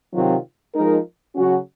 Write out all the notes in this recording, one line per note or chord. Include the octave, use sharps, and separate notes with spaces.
C3 D#3 F#3 C4 F4
F3 G#3 D#4 A#4
C#3 F#3 C#4 F#4